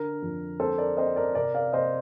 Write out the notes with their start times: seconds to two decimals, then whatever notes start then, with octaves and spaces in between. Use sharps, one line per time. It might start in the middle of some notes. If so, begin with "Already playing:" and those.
Already playing: D3 A#4
0.22 F2
0.60 C4 A4 C5
0.78 A#4 D5
0.97 C4 C5 D#5
1.16 A#4 D5
1.35 C3 A#4 D5
1.54 D5 F5
1.73 C3 C5 D#5